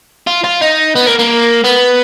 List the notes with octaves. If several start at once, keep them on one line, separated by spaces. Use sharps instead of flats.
F4
F4
D#4
B3
A#3
A#3
B3